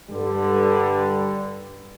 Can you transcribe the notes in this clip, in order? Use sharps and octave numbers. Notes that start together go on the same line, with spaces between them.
G2 D3 G3